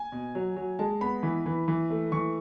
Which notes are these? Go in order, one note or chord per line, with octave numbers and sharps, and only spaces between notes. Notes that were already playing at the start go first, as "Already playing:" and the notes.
Already playing: G#5
B2
F#3
F#3
G#3 A5
B3 B5
E3
E3
E3
A3
E3 C#6